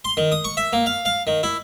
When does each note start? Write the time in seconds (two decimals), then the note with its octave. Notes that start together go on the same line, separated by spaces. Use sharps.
0.05 C6
0.17 D#3
0.32 D#6
0.44 C#6
0.57 E5
0.73 A#3
0.86 F5
1.05 F5
1.27 D#3
1.43 E4